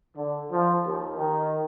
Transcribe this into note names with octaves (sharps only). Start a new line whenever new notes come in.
D3
F3
D#2
D#3